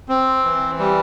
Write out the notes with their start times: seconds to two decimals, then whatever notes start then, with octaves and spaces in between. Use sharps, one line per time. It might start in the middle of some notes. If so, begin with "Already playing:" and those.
0.09 C4
0.44 E3
0.79 G3